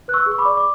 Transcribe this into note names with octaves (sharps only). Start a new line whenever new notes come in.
B4 F#6
C#6 E6
G#4
C#6
B5 D6
D5
D6